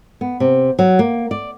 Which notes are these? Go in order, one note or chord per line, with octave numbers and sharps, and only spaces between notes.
B3
C3
F#3
A#3
D5